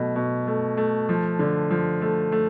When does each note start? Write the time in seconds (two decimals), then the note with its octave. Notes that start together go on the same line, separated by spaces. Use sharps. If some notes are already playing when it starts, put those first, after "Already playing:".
Already playing: B2 F#3 A3
0.16 B2
0.47 A3
0.77 A3
1.09 F3
1.39 D3
1.70 F3
2.02 A3
2.32 A3